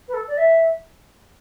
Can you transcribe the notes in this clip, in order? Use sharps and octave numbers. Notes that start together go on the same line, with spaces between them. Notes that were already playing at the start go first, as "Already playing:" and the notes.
B4
A4
D5
E5